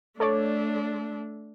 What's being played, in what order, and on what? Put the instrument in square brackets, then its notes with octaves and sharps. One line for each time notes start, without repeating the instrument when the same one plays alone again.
[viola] A3 D4 [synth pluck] A4 C#5 D5